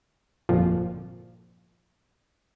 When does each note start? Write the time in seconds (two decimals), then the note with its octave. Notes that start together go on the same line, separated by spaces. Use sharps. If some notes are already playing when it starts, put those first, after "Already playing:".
0.49 G1 F2 A#2 F3